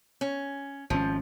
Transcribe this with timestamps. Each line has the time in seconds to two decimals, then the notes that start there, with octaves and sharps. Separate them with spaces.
0.21 C#4
0.90 G#1 D3 F3 C#4